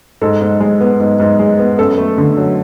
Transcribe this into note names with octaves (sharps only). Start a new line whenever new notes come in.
G#2 A4
G#2
G#3
B3
G#2
G#2
G#3
B3
F#2 A4
A3
D3
F#3